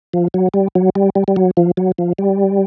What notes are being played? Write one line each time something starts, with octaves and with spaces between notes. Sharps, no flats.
F3
F#3
G3
F#3
G3
G3
G3
F#3
F3
F#3
F3
G3